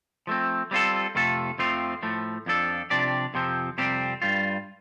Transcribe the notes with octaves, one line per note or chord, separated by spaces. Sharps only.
F3 A3 C4
G3 C4 F4 A4
F2 C3 A3 F4 A4
F2 F3 A3 C4 F4
A2 F3 A3
F2 F3 D4 A4
C3 F3 D4 G4 D5
F2 C3 F3 C4
F2 C3 G3 C4 G4
G2 G3 F4